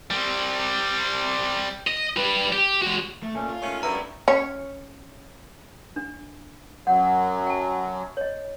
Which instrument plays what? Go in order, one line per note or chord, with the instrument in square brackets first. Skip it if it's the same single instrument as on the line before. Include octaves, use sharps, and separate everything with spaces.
[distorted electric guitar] G3 C4
D#5
G3 B4
G4
G#3 F#4
[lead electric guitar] A3
[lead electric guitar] A#2 [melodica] A3 C#4
[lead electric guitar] F4
[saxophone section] D#3 G#3 C#4 [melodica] A3
[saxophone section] F#2 A2 [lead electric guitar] D4 B4 [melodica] C#5 E5 [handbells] A#5
[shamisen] C#4 C#5
[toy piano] D4
[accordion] F#2 F#3 [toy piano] F#5
[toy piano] G5 A5
C#5 D#5